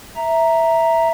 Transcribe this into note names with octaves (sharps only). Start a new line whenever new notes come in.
E5 A#5